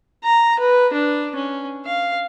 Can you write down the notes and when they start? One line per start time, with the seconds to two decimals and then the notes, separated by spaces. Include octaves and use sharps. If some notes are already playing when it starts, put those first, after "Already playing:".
0.24 A#5
0.59 B4
0.93 D4
1.35 C#4
1.86 F5